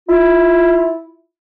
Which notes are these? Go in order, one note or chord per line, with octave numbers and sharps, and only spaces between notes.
E4 F4